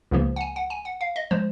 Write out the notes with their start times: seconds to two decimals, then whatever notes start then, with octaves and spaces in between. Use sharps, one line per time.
0.11 C#2 C#3 F3 A#3
0.36 F#5
0.41 G#5
0.56 F#5
0.70 G#5
0.85 F#5
1.01 F5
1.16 D#5
1.31 F3 G#3 C5